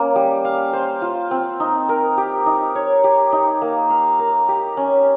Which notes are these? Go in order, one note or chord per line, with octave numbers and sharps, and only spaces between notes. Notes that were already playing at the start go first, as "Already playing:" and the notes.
Already playing: A#3 C#4
G3
F5
C5
F4
C4
D#4
A#4
G4
D#4
C#5
G4
D#4
A#3
F5
A#4
G4
C#4